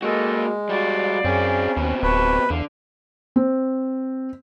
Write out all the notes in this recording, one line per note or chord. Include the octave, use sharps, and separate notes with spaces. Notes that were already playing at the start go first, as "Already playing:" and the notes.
G#3 A#3 F#4 A4 D#5
G3 F#4 D5 F5
F#2 C4 C#4 G#4
D#2 B2 C4
D1 B4 A5 C#6
E2 D3 F5
C4